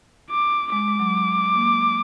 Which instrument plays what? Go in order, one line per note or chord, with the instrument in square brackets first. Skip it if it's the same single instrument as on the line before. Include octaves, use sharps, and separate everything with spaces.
[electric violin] D6
[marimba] G#3 [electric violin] D6
[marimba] G#3
F#3
A#3